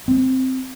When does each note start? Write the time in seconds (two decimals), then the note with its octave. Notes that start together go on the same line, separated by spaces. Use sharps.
0.08 C4